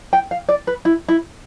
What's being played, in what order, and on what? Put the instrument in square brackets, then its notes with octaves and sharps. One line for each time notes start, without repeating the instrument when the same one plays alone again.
[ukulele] G5
F5
D5
B4
E4
E4